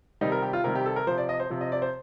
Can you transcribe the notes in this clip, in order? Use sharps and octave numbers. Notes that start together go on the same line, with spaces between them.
C3 D#3 G3 D#4
A#4
G4
F4
C3 D#3 G3 A#4
G4
A4
A#4
C3 F3 C5
D5
D#5
C5
C3 F3
D#5
D5
C5